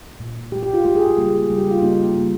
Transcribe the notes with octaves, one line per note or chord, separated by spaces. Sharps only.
A#2 G#3
A#2 G#3 G4
G4
F4
A#2 G#3 G4
G#4
G4
C#3 G3 A#3
C#3 G3 A#3
G4
F4
C#3 G3 A#3 D#4
C#3 G3 A#3